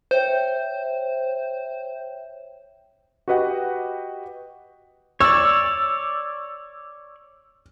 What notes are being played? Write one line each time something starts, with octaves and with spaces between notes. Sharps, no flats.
C5 C#5 E5 G5
F#4 G4 B4 D#5 F#5 G5
C#5 D5 E6